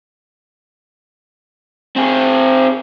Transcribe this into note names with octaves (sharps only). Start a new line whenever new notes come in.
C4 G#4